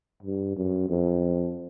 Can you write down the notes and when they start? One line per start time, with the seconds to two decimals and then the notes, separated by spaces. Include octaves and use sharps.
0.23 G2
0.57 F#2
0.89 F2